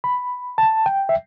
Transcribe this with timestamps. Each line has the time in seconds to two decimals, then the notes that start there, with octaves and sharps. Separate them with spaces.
0.04 B5
0.58 A5
0.86 G5
1.09 E5